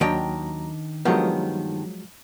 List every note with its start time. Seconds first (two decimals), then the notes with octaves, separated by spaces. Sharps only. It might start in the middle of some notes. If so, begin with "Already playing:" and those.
0.01 D#2 D#3 F#3 D4 G5 A#5
1.05 G2 D#3 F3 F#3 G#3 B3